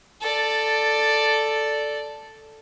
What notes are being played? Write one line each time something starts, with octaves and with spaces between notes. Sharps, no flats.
A4 D5